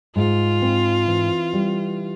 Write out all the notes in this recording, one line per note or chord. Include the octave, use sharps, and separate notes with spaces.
G#2 F4
C4
E3
G3